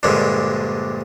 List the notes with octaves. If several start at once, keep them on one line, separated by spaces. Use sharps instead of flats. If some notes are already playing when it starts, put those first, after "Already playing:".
A#1 G2 A#2 D3 G#3